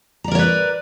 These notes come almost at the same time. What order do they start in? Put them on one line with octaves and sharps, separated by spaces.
A#5 D5 A#4 C#5 B4